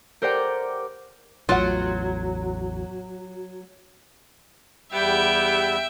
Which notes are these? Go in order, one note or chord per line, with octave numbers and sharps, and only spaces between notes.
G4 A#4 C5 D5 F#5 G5
A1 E2 A2 F#3 F4 F#5
E2 G3 B3 G4 E5 G5